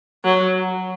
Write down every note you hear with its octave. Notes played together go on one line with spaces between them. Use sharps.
F#3